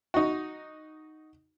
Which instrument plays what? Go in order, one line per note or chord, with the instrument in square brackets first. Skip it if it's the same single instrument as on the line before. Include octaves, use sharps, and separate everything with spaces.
[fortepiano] D#4 F#4